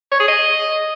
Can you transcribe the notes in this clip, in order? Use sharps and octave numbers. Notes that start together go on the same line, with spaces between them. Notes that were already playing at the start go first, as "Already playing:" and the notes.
C#5
G#4
D#5